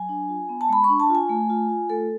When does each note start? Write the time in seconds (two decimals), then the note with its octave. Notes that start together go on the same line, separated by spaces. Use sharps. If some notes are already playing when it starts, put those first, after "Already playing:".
Already playing: F#3 G#5
0.09 D4
0.29 F4
0.49 B3
0.61 A5
0.69 G#3 B5
0.84 D4 C#6
1.00 A5
1.10 F4
1.15 G#5
1.29 A3
1.50 F4
1.69 F4
1.90 A3 A4